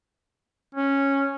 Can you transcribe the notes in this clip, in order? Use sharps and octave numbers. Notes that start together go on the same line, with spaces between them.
C#4